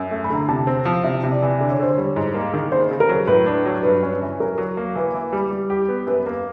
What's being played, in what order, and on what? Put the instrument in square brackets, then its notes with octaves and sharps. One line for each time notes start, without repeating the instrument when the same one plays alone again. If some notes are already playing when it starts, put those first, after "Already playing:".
Already playing: [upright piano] F#2
A3
[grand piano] B5
[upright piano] D3 [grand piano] A#5
[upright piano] C3 [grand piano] A5
[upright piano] C4
F3
[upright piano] C3 [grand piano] E5
[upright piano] C3
[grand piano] D5
[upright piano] E3
[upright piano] D3 [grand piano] D5
[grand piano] C#5
[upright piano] D3 [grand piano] C5
[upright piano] G3 [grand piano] C#5
[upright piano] G#2
A#3
D#3
[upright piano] C#3 [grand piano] C5
[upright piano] C#3
[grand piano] A#4
[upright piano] F#3
[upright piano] A2 [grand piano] B4
[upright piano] D4
F#3
[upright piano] G2 [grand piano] B4
[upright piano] C#4
E3
[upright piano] F#3 [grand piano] A#4
[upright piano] F#3
A#3
[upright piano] E3 [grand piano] B4
[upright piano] E3
G3
G3
G4
B3
[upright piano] F#2 [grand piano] B4
[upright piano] A#3